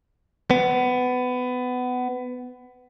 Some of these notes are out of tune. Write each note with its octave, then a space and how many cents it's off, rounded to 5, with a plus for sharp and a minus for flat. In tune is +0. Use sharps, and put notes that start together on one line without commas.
B3 +20